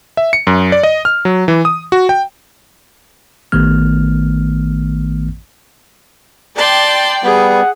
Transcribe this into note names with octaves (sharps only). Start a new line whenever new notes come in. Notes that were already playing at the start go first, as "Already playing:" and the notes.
E5
C#7
F#2
D5
D#5
F6
F#3
E3
D#6
F#4
G5
A1 D#3 A3 B3 F6
D5 G5 A5 C6
G3 B3 G#4 F#5